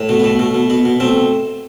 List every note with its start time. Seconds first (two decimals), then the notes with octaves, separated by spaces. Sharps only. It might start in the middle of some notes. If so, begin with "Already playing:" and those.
Already playing: A2
0.09 B2 A3
0.20 B3
0.24 B2 A3
0.39 B2 A3
0.54 B2
0.70 B2 B3
0.85 B2
1.00 B2 A3 C4